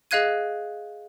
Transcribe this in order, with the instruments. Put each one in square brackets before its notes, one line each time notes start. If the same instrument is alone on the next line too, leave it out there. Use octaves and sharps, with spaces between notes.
[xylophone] G#4 D#5 F5 F#6 G#6 D#7